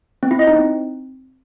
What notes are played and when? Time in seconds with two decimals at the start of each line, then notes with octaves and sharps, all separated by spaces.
0.23 C4
0.31 E4
0.39 D#5
0.47 D#4
0.56 C4